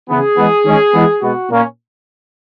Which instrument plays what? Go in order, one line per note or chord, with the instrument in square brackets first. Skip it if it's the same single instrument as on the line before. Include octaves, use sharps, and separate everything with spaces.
[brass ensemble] C#3 E3 B3 G#4
E3 G#3 B3
D#3 G#3 C#4
E3 G#3 B3
B2 G#3 B3 F#4
A#2 A#3 C#4